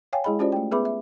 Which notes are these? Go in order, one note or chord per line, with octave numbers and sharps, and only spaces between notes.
C#5 F5 G5 G#5
G#3 E4 G#4 D#5 B5
C#4 F4 G4 C5 D5
A3 G5
B3 G#4 B4 E5 B5 D6
E5